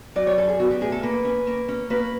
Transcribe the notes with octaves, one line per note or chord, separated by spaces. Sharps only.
F#3 D5
C#5
F#2 A4
G#4
B3 F#4
G4
A2 G#4
A4
A#3 B4
C#4
A#3
C#4
A#3 B4